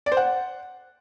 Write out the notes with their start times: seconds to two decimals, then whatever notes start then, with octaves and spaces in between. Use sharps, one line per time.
0.06 D5
0.12 C5
0.17 F#5